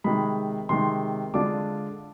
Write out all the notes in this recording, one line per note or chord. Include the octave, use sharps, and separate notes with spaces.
C3 D#3 G#3 B5
C3 D#3 G#3 C6
D3 G#3 D4 F4 D6